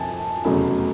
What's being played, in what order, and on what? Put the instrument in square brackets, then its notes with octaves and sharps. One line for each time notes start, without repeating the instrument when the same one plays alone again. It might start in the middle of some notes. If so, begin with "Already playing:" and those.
Already playing: [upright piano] F2 F3 G#5 A5
F1 E2 C#3 F#3 A3